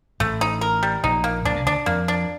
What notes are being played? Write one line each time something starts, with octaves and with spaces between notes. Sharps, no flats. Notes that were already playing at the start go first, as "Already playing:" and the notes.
A1 A2 A3
D#4
A#4
G3
A#1 A#2 D#4
A#3
A#1 A#2 D4
C2 C3
D2 D3 D4
F2 F3 A#3
D4